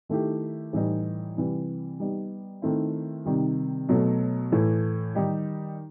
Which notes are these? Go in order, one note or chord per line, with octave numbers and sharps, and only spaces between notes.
D#3 A3 E4 G4
A2 E3 G3 D#4
C3 E3 G3
G3 B3 D#4
D#3 A3 C4 E4
C3 D#3 G3
B2 F#3 A3
A2 E3 A3
D#3 G3 D#4 G4